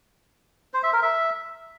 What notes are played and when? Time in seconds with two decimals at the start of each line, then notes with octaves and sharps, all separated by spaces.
0.74 C5
0.83 E5
0.93 A#4
1.03 E5